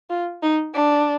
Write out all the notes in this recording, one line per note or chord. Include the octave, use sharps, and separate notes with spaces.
F4
D#4
D4